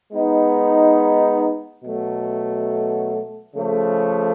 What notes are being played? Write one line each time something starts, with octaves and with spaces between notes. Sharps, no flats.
G#3 B3 D#4
B2 F#3 A3
C#3 F3 A3